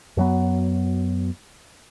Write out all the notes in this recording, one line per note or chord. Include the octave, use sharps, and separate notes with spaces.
F#2 F#3 B3